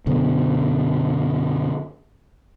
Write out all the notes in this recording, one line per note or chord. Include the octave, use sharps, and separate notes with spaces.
F#2 B2 D3